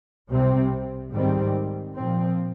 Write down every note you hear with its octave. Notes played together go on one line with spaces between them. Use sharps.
C2 C3 G3 C4
G#2 D#3 G3 C4
A#2 F3 C4